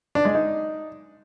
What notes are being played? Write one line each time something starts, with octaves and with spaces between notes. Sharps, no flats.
D4
G#3
D#4